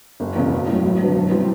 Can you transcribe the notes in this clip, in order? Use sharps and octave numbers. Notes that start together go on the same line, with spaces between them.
F#1
E2 C#3
B1
A2
F#3
G#1
F#2 D3 F#3 B3
B2
G3 C4 E4